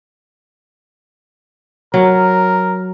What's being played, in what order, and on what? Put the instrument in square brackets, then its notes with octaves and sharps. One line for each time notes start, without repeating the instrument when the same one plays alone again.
[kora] F#3 [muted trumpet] A#4